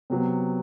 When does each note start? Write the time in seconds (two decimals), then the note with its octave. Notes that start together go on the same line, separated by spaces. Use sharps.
0.10 C3 F#3 B3